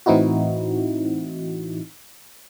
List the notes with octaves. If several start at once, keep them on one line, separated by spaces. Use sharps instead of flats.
A2 E3 C4 D#4 E4 F#4